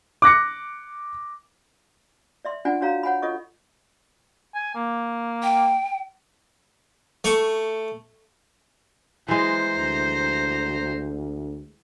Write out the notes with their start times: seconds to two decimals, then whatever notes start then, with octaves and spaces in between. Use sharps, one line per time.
0.22 D6 F#6 A#6 C#7
2.45 D5 E5 C6
2.65 D4 F4 D5 F#5 G#5
2.81 D4 F#4 C#5 F5 A#5
3.03 C#5 F#5 G#5 B5
3.22 F4 A4 C#5 D#5 C#6
4.55 G#5
4.75 A#3
5.43 G5
7.24 A3 C#6
9.28 E3 G#3 C5 A#5
9.76 D2